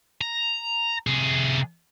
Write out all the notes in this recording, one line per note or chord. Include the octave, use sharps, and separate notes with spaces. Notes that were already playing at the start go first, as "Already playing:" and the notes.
A#5
C3 G#4